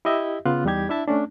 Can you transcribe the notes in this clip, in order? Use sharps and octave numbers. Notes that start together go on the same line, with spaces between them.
E4 G4 D#5 E5
C#3 B3 F4 F#6
E2 G3 D#4 G4 G#6
D4 E4 E5 A5
A3 C#4 D4